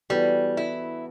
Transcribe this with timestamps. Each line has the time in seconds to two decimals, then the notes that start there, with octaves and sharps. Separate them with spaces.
0.10 E3 G3 B3 F#4 A4
0.57 E4